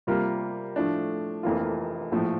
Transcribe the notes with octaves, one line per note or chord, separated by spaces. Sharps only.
C3 G3 A#3 F4 A#4
A2 F3 A3 D4
F1 F2 E3 A#3 F4
A#1 A2 F3 A3